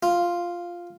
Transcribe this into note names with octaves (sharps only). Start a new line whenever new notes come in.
F4